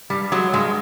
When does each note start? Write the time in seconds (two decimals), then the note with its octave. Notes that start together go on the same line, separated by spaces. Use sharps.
0.10 G2 G3
0.32 F#3 G#3
0.54 G2 F#3 G#3